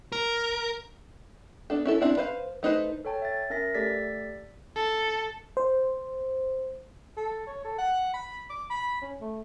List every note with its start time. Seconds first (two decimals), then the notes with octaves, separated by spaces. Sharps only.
0.12 A#4
1.70 B3 D4 A4
1.85 C#4 E4 A4
2.01 C4 D4 E4
2.17 B4 C5 F5
2.63 A3 D#4 B4 C5
3.05 A4 C#5 G5 A5
3.22 E5 A6
3.50 C#4 A#4 E5 A#6
3.75 A3 G4 A4 D5 A6 B6
4.76 A4
5.57 C5
7.17 A4
7.47 C#5
7.64 A4
7.78 F#5
8.14 B5
8.50 D6
8.70 B5
9.01 C#4
9.21 A3